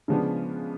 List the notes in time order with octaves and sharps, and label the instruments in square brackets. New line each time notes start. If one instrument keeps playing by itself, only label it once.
[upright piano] C#3 F3 G#3 B3 D4